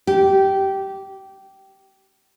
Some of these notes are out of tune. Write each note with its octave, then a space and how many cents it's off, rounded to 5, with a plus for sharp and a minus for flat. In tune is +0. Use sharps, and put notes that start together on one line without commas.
G4 -15